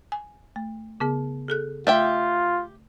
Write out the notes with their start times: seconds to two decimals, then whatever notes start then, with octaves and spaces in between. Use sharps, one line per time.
0.12 G#5
0.56 A3
1.00 C#3 B3 G#4
1.48 G#4 A4 F#6
1.87 A3 F4 G4 E5 G5